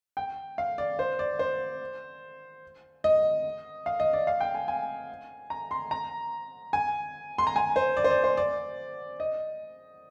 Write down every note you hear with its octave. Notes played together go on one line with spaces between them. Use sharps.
G5
F5
D5
C5
D5
C5
D#5
F5
D#5
D5
F5
G5
G#5
G#5
A#5
C6
A#5
G#5
C6
A#5
G#5
C5
D5
C5
D5
C5
D5
D#5